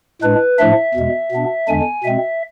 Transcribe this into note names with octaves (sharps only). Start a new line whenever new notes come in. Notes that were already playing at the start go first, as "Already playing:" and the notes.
A2 G#3 D4 B4
A2 F3 A3 D4 E5
E2 B2 G#3
B2 B3 D4
E2 D3 G#3 D4 G#5
B2 G#3 C4 E5